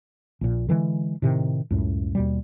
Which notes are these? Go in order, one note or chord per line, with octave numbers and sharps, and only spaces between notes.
A#1 A#2
D3 E3 G3 G#3
A2 C3 D#3
C#2 F#2 A2
D#2 B2 G3